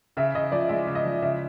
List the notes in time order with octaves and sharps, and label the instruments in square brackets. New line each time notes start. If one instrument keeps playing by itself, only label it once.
[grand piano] C#3 [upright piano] E5
[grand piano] C#3 [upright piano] D#5
[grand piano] F3 [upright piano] D5
[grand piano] G#3 [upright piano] E5
[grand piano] C#3
[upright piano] D#5
[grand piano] F3
[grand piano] C#3 [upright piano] E5